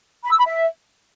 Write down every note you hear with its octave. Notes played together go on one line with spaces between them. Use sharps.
B5
E6
B5
E5